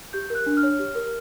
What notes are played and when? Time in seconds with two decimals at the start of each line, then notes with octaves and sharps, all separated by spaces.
0.13 G4 G6
0.30 A#4 F#6
0.46 D4
0.57 F6
0.63 C#5
0.79 G4
0.95 A#4